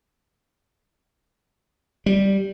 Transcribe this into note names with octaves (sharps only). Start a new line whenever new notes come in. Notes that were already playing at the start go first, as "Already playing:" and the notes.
G3